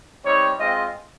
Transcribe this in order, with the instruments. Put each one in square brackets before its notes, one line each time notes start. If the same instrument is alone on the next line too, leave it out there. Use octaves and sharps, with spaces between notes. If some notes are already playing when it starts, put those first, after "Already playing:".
[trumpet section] G3 C4 D#4 C#5
G#3 C4 F4 D#5